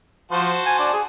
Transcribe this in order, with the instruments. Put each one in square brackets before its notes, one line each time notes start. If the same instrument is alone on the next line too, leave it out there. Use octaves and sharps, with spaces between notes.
[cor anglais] F3 [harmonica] F#4 C5 A5
[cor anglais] G#5
D4
G#4